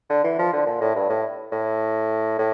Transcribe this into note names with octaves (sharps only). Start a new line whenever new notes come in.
D3
E3
F3
D3
A#2
A2
G2
A2
A2
A2